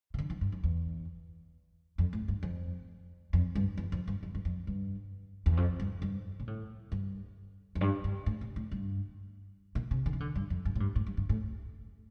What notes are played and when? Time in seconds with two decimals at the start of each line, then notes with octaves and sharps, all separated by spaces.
0.14 C3
0.19 D3
0.30 E3
0.41 G2
0.52 F2
0.64 E2
1.98 F2
2.13 A2
2.28 G2
2.43 F2
3.33 F2
3.55 G2
3.77 E2
3.92 F2
4.08 G2
4.23 F2
4.35 G2
4.45 F2
4.67 G2
5.46 E2
5.57 F2
5.80 G2
6.02 G2
6.40 A#2
6.47 A2
6.92 G2
7.75 F2
7.81 G2
8.04 G2
8.26 A2
8.41 A#2
8.56 A2
8.71 G2
9.75 A#2
9.91 C3
10.06 D3
10.13 E3
10.20 D3
10.35 G2
10.50 F2
10.65 G2
10.75 A2
10.80 G2
10.96 A2
11.07 G2
11.17 G2
11.29 A2